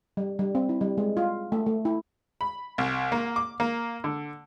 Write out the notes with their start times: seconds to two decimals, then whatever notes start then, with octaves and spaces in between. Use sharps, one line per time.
0.17 G3
0.39 G3
0.55 C4
0.69 E4
0.81 G3
0.98 G#3
1.17 F4
1.52 A3
1.66 A3
1.85 E4
2.41 B5
2.78 C2
3.12 A#3
3.36 D6
3.60 A#3
4.04 D3